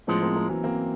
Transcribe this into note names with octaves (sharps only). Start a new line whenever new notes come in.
A2 F3 G#3 B3 C#4
A#3 C4
A#3 C4
E3 F#3
A#3 C4